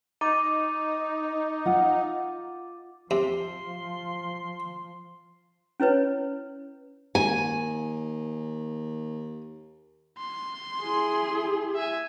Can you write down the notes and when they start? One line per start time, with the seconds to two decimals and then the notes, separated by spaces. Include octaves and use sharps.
0.21 D#4 D6 A6 D#7
1.65 F4 F#5
3.11 C3 F3 C6
5.80 C#4 E4 B4 C#5
7.15 D#2 G#5
10.18 C6
10.83 E4 G#4
11.75 E5 G#5